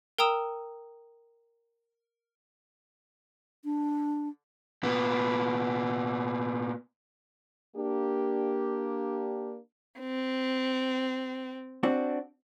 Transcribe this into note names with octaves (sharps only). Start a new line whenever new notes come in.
A#4 G5 A#5 D#6 E6 E7
D4
A#2 B3
A#3 D4 G4
C4
C4 D4 F#4